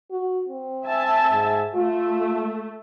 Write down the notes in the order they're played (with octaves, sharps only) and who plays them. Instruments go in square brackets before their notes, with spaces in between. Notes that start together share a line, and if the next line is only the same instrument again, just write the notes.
[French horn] F#4
C4
[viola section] E5 G#5 A5
[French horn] G#2
[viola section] A3 [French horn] F4